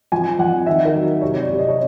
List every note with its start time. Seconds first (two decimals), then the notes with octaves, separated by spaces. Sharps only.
0.12 F3 G#5
0.39 F3 F#5
0.66 D#3 E5
0.85 A#4
0.95 F#3
1.21 C3 C#5
1.40 D5
1.49 C3
1.59 D#5
1.68 C#5